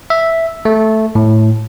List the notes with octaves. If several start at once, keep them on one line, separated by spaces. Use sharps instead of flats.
E5
A3
A2